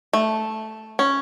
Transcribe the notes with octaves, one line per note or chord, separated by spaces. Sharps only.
A3
C#4